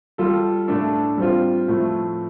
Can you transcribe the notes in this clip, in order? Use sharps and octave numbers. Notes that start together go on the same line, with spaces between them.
G3 F4 A4
A2 A3 D4 A4
G3 C4 F4
A2 F3 A3